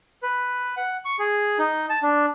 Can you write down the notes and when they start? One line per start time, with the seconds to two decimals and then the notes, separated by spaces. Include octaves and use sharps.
0.23 B4
0.77 F#5
1.05 C#6
1.19 G#4
1.59 D#4
1.90 A5
2.03 D4